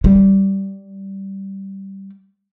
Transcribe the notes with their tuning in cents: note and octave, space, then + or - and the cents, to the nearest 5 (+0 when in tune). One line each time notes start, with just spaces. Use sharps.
G3 -10